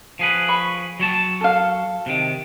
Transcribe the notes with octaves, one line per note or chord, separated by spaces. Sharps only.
F3 G#4 B4
B5 C#6
F#3 C#5 A5
A4 F5
C3 D#3